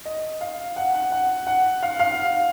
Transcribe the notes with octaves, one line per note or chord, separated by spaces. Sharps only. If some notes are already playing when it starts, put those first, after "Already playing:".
D#5
F5
F#5
F#5
F#5
F#5
F5
F5